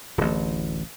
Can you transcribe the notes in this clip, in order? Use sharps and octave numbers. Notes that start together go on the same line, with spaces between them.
D1 A1